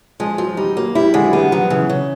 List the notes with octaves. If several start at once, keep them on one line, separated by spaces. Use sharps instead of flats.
F3 G#3
F3 F#3
G3 D#4
F#3 A#3
G3 E4
D3 G#3
F#3
G3 B3
F3 F#3
C#3 E3
C#3